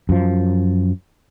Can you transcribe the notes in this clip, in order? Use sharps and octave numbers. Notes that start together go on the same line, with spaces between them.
F#2 F3